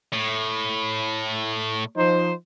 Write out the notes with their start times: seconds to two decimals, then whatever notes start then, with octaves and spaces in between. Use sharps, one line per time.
0.13 A2
1.97 F3 D#4 C5